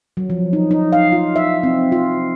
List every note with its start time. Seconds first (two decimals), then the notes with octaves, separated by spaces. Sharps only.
0.17 F#3
0.30 F3
0.53 D#4
0.71 D#4
0.93 F5
1.12 F4
1.36 E5
1.63 C4
1.92 F4